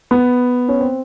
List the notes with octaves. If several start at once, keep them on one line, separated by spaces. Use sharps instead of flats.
B3
C#4
C4